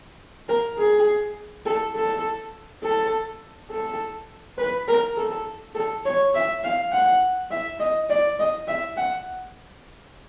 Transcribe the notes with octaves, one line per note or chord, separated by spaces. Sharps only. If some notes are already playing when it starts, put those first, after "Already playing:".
A#4
G#4
A4
A4
A4
A4
B4
A#4
A4
A4
C#5
E5
F5
F#5
E5
D#5
D5
D#5
E5
F#5